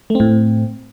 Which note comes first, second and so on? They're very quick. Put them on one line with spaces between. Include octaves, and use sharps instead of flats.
A3 C4 A2